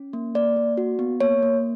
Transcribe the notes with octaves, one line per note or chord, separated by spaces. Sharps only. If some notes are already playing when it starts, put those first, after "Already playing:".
Already playing: C#4
A#3
A#3 D5
A#3
F#4
B3
A#3 C#5
A#3